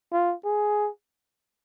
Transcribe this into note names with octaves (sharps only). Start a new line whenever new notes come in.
F4
G#4